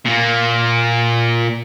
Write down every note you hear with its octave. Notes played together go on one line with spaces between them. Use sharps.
A#2 A#3